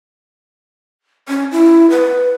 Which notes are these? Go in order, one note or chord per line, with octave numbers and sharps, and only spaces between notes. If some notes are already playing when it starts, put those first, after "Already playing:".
C#4
E4
B4